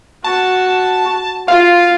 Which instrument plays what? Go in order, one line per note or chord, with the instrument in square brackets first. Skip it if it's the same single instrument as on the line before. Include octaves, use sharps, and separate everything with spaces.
[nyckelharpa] F#4 [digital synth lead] A5
[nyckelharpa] F4 [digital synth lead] F5